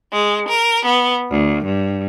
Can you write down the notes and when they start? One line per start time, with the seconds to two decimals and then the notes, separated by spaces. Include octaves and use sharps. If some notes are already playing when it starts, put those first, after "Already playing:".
0.14 G#3
0.49 A#4
0.86 B3
1.32 D2
1.67 G2